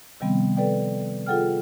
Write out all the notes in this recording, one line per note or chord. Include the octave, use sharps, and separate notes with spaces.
C3 D#3 F3 G3 B3 C4
A4 B4 D5 G5
F4 G#4 A4 F#5 G5 F6